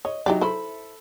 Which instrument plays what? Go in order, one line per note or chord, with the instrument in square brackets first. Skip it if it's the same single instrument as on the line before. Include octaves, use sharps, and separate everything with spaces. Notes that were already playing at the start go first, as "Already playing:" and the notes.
[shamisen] C#5 [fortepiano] D#5
[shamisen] E3 G4 D5 [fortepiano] F#3 D#4
[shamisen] E4 C5 [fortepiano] A4 B5